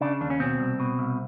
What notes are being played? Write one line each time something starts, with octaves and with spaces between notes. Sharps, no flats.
C#3 D4
D#2 D4
C#4
B2 C4
C2
B2
C2